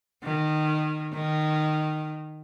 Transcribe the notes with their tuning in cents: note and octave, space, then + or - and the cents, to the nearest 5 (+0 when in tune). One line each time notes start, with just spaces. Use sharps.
D#3 -20
D#3 -15